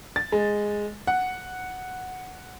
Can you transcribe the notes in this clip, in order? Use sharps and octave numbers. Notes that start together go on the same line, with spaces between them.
A6
G#3
F#5